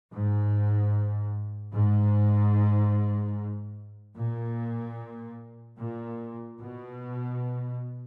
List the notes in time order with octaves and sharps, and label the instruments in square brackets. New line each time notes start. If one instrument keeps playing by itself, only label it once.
[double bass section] G#2
G#2
A#2
A#2
B2